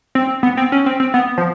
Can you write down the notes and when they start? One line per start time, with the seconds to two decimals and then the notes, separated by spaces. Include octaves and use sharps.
0.15 C4
0.43 B3
0.57 C4
0.72 C#4
0.86 C4
1.00 C4
1.14 B3
1.38 F3